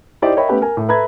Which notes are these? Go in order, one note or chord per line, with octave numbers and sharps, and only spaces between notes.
D#4 E4 G4 C5 D5
A#4 C#5 D#5 E5 G5 B5
A3 B3 C#4 G4 B4 G5
A#4 G#5
A2
A4 B4 E5 A#5 B5 G#6